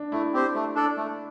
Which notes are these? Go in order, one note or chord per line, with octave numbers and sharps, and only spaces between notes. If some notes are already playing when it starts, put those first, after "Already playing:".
Already playing: D4
A3 E4
C4 G4 C5
A3
D4 A4 D5
A3